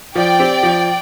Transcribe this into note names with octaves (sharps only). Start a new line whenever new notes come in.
F3 D5 G5
C4 G4
F3